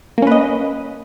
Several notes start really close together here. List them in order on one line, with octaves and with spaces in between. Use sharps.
A#3 C#4 B4 D#5